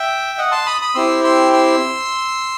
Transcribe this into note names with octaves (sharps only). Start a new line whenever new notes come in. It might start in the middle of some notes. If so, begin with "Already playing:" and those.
Already playing: E5 G5
D#5 F#5
A5 C6
B5 D#6
B5 D#6
C4 E4 G4 C6 E6
C6 E6
C6 E6